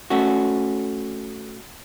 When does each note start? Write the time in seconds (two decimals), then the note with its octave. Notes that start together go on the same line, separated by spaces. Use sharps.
0.10 A3 C#4 F#4